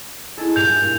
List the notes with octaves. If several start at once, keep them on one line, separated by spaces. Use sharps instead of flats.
E4 G#4 A4 D#5 G#5
G2 A#2 G6 F7